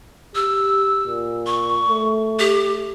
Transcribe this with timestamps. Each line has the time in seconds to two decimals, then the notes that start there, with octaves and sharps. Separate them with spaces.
0.35 G4 E6
1.07 A#2
1.46 C#6
1.89 A3
2.39 G4